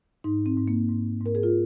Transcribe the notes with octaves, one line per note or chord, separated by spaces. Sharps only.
G#2 D#4
C4
G#2
A#3
G#2
G#2 A#4
G#4
F4